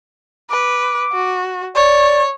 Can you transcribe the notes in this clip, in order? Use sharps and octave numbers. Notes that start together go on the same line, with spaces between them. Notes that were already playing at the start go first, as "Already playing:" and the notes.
B4 D6
F#4
C#5 D5